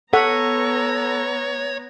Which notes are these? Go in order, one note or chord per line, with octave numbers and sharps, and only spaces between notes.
B3 A4 C#5 F#5 A#5